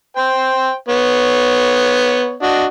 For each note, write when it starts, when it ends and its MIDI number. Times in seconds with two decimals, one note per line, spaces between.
0.17 0.73 72
0.17 0.73 79
0.89 2.35 59
0.89 2.35 73
2.42 2.65 62
2.42 2.65 66
2.42 2.65 75